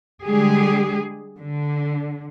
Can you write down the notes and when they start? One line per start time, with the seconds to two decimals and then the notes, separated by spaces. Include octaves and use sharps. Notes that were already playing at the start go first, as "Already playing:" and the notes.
0.24 D3 G3 G#3 G4 G#4
1.38 D3